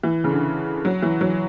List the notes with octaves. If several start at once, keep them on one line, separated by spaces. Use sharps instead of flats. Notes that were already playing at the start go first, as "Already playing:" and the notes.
E3
C#3
D3
F#3
E3
F#3